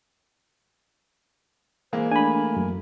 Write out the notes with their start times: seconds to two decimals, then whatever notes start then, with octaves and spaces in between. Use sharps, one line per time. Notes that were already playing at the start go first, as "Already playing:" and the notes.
1.93 E3 G#3 A#3 C5
2.11 A3 D4 G#5 B5
2.56 F#2